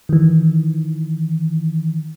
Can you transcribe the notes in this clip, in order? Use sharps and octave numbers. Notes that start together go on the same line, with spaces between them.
D#3 E3